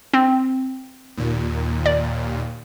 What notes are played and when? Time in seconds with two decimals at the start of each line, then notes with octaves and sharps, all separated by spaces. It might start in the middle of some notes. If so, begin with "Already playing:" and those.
0.13 C4
1.17 D#2 A#2
1.86 D5